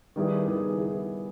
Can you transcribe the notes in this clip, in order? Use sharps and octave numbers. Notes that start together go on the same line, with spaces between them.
D#3 G3 B3 E4 G#4
D#3 G3 B3 E4 G#4
E4 G#4